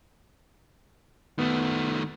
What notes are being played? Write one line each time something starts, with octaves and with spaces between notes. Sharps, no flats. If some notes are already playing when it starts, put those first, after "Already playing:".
D#3 A3 B3